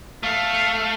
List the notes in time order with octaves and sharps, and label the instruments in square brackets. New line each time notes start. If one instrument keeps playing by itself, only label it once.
[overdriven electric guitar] A3 [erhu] F5